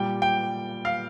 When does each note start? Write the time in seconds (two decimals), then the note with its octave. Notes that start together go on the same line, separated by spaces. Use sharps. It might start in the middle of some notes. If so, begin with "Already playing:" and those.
Already playing: A#2 G3 G5
0.22 G5
0.85 F5